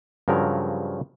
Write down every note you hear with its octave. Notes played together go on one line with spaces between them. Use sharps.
G2 C#3 F3 F#3 A#4